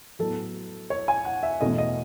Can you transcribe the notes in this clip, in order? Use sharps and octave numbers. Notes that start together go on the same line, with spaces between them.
A2 F#3 B3 A4
C#5
G#5
F#5
E5
E2 B2 A3 C#4 D#5
D#5